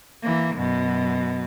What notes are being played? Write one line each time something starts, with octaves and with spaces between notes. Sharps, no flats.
E3 A#3
F#2 B2